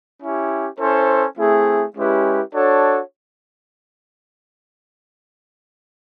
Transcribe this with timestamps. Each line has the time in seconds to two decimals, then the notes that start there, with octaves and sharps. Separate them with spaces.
0.21 C#4 E4 G4
0.79 C#4 E4 A4 C5
1.38 A3 C4 E4 G#4
1.96 G#3 C#4 E4 G4 B4
2.54 D4 F#4 A4 C#5